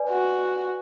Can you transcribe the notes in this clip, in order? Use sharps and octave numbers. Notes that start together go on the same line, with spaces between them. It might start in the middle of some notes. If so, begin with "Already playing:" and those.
Already playing: B4 D5 G#5
F#4